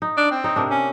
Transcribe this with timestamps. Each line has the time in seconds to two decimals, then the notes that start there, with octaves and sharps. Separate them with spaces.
0.02 D#4
0.17 D4
0.31 C4
0.44 D#4 C#5
0.56 C3 A#3 D4
0.70 C#4